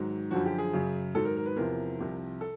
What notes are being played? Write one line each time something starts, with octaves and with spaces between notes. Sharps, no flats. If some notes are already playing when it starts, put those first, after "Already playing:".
Already playing: G#2 D#3 F#3
F#2 D3 F3 F#4
G4
G#4
F#2 C#3 F#3
G#2 D#3 F#3 A4
A#4
A#4
B4
E2 C3 F3 A#4
C2 C3 F3
A4